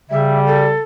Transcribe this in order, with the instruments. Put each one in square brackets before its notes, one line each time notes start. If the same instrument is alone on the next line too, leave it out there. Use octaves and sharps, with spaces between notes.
[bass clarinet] C#3 [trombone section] G3 [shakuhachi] E5
[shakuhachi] A4